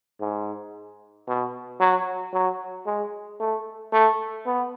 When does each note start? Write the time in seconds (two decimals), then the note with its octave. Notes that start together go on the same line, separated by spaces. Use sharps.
0.20 G#2
1.28 B2
1.80 F#3
2.33 F#3
2.86 G#3
3.40 A3
3.93 A3
4.46 B3